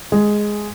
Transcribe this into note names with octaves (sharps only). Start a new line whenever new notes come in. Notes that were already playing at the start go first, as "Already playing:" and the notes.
G#3